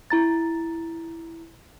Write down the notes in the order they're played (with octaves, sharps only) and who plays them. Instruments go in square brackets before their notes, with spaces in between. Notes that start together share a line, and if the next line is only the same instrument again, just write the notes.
[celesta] E4 A#5 A6